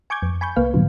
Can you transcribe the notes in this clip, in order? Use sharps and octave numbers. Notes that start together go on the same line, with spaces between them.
G#5 C#6 D6 G6 G#6
F2
G#5 B5 C#6 G6
C2 A#3 B4 F5
G#2 B2 D3 F3 F#3